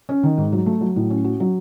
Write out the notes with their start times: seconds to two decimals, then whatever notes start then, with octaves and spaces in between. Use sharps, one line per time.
0.09 C#4
0.23 D#3
0.38 G#2
0.53 F#3
0.66 A3
0.81 F#3
0.96 A2
1.10 C#4
1.24 F#4
1.40 F#3